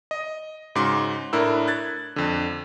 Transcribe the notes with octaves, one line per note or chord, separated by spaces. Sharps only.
D#5
G#2 C#3 F#4 C6 D6
A2 D4 E4 A#4 E6
F#6 G#6 A6
F2 D3